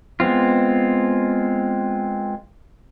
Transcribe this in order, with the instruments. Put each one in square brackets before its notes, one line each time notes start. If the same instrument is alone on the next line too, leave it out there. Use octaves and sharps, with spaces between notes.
[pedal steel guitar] G#3 B3 C4 F4